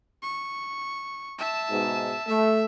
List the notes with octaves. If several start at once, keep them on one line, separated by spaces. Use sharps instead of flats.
C#6
E5 A5
G#2 B2
A3 E5